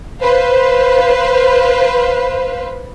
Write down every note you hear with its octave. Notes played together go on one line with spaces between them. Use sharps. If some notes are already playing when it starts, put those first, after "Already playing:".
B4 C5 F5